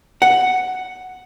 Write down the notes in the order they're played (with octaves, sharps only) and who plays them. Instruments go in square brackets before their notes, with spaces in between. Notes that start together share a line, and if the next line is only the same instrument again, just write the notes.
[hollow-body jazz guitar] F#5